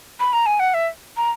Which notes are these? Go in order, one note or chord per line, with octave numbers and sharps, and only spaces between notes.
B5
A#5
G#5
F#5
E5
A#5